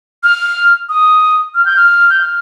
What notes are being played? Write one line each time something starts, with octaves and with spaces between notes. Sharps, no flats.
F6
D#6
F6
G6
F6
G6
F6